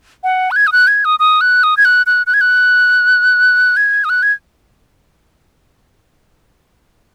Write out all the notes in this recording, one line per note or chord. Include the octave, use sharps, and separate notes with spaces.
F#5
F#6
G#6
D#6
F#6
G#6
D#6
D#6
F#6
D#6
G#6
F#6
F#6
F#6
G#6
F#6
G#6
D#6
F#6
G#6